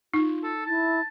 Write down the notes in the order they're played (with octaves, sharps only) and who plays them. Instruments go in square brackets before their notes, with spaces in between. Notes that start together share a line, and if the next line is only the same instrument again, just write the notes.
[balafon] D#4 [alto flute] F4
[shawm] A4
[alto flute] E4 [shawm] A5